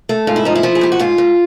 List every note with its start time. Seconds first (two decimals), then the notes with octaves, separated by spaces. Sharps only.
0.09 A3
0.27 G#2 F4
0.36 E4
0.45 F3 D#4
0.55 E4
0.63 F3
0.75 G#4
0.81 G#2 G4
0.92 F#4
0.99 G#2 F4
1.18 G#2